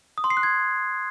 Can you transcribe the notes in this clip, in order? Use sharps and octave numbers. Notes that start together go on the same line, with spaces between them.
D#6
C6
C7
F#6
G#6